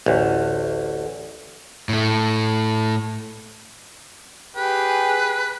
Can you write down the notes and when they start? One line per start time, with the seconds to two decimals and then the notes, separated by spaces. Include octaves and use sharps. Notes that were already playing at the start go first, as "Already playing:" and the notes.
0.06 A1 D2
1.89 A2 A3
4.56 G4 G#4 B4